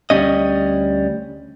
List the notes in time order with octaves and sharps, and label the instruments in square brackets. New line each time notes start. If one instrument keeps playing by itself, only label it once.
[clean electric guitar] D2 G3 C#4 D#5